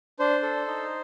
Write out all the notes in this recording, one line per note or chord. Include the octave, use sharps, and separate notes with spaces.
D4 C5
A4
D#4